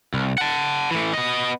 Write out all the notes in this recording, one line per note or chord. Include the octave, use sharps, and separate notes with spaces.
C2
F#5 A5
E3 A3
B3 D#5